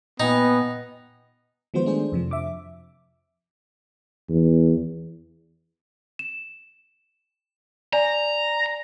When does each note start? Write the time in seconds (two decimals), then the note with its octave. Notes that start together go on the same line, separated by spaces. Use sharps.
0.20 A#2 B3 D#4 G5 G#5
1.74 D#3 F3 G#3 B3 F#4 C5
1.85 A3 D4 G#4 C5
2.12 F2 C3 F3
2.31 E5 D6
4.29 E2
6.19 E7
7.93 D5 G#5 A#5